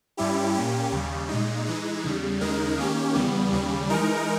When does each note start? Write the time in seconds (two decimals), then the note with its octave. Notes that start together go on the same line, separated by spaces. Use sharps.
0.17 G2 G3 C#4 E4 G4
0.54 A#2 A#3 C#4 G4
0.91 D#2 C#3 G3
1.29 A#2 G#3 D#4
1.66 E3 G#3 D#4
2.04 E2 C#3 G3
2.40 D#2 C#3 G#3 D#4 A#4
2.78 D#3 A#3 C#4 G4
3.15 E2 C#3 G3 B3
3.52 D#2 C#3 G3
3.89 E3 G#3 D#4 A#4